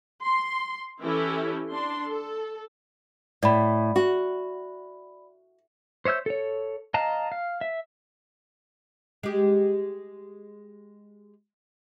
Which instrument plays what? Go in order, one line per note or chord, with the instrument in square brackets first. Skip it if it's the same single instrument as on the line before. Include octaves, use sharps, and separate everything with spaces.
[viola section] C6
E3 C#4 E4 G4 A4
D4 C6
A4
[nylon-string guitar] A2 [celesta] D5 B5
[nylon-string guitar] F#4
[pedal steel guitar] C5 C#5 E5 E6 G6
A4 C#5
D#5 F5 A5 A#5
F5
E5
[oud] G#3 G4